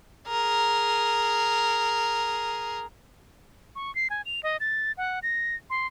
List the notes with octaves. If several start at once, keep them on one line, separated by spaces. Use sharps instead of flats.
G#4 A#4
C#6
C7
G#5
F7
D#5
A6
F#5
A#6
C6